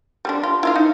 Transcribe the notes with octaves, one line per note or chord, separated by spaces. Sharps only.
G3 C4 D4
F4
E4 F4 F5
D#4